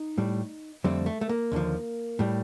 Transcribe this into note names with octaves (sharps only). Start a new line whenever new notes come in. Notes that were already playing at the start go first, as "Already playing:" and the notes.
Already playing: D#4
A2 G3
F2 D3 G3 A3 C4
A3
A3
A#3
D#2 D3 F3
A2 G3